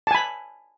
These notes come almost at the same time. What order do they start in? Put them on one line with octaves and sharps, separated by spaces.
A5 G#5 B5